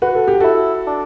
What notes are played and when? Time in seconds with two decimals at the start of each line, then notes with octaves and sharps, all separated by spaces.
0.02 F#4 B4
0.15 A4
0.28 G4
0.40 E4 F#4 A4
0.87 D4